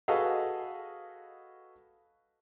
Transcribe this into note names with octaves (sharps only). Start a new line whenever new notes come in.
F#4 G#4 A4 B4 D#5 F5